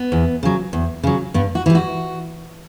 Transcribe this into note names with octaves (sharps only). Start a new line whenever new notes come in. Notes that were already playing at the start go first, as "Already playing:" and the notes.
Already playing: B3
E2
C#3 F#3
E2
C#3 F#3
G2 B3
F#4
E3 G3
F#4